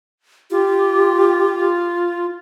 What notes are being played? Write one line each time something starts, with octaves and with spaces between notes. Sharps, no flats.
F4 G4